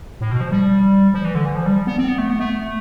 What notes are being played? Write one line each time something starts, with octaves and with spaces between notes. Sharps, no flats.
A2
B2
F3
G3
F3
E3
D3
E3
F3
G3
B3
C4
B3
A3
B3
A3